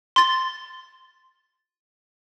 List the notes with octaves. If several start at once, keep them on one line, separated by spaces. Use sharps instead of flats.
C6 A6